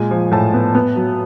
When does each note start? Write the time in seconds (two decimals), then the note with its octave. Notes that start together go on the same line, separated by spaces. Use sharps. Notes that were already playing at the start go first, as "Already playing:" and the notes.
Already playing: A#2 G#3 G#5
0.11 F3
0.31 A2 A5
0.54 B3
0.75 B3
0.96 F#3